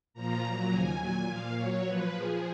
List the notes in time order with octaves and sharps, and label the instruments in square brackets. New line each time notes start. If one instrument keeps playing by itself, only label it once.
[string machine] A#2 F3 A#5
A#2 F#3
D#2 C#3 F3 G#5
A#2 F#3
F3 F5
A#2
A#2 F#3 C#5
A#2 F3 B4
A#2 F3 G#4